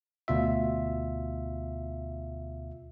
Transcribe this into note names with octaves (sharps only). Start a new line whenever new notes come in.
D2 B2 F4 E5